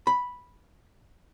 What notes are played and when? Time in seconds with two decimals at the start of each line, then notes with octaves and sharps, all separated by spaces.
0.07 B5